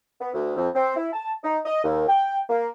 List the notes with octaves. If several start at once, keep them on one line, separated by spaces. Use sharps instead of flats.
B3
D2
F2
C4
E4
A5
D#4
D#5
D#2
G5
A#3